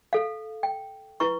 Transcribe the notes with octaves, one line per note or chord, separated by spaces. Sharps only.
A4 F5
G5
E4 B4 A#5 C#6